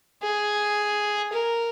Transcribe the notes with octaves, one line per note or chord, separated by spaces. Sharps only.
G#4
A#4